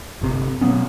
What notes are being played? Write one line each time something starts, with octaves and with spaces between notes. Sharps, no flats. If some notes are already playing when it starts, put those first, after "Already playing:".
G1 C3
B2 F#3 B3 C#4